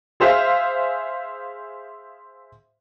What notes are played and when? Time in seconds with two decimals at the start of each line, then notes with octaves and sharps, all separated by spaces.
0.20 G#4 C5 E5 F5